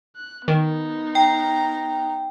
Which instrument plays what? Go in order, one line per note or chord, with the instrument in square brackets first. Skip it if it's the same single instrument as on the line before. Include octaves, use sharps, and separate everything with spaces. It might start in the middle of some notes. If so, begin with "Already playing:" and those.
[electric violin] F#6
[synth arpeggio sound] D#3 [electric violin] B3 D#4
[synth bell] G5 [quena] A#5